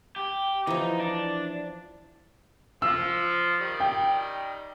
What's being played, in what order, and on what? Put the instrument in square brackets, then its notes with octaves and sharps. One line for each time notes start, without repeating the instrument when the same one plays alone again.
[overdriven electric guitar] G4
[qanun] E3 F3 [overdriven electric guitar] D#4
[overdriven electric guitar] D4
[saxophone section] F3 [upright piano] E6
[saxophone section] D#3 G3
[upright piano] G5